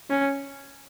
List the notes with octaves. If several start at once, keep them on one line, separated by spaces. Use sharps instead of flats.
C#4